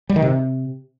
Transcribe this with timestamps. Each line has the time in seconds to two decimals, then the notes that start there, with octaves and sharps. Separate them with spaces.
0.09 G3
0.16 D#3
0.22 C3